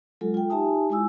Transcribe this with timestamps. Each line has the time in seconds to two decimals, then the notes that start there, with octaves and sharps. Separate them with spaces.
0.21 F#3 G#3 F4 A4
0.34 F4 G5
0.50 D#4 G4 E5 G#5 A5 D#6
0.90 G#3 E4 F4 G#5 D#6 E6